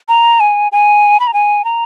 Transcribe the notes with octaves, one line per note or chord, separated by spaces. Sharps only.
A#5
G#5
G#5
B5
A#5
G#5
A#5